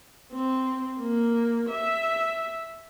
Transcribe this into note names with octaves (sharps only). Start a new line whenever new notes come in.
C4
A#3
E5